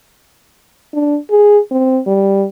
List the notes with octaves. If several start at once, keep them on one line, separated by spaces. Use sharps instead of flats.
D4
G#4
C4
G3